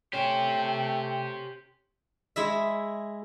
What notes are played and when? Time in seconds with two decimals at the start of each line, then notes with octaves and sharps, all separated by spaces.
0.13 A3 C#4 G4 C5 G5
2.36 G#3 E4 E5